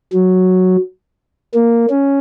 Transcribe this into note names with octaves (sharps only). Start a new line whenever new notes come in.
F#3
A#3
C#4